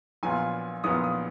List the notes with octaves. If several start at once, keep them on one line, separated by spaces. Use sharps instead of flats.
A#1 A#2 F#3 B3 F4 G#5
A#1 A#2 F#3 B3 F4 D#6
D#6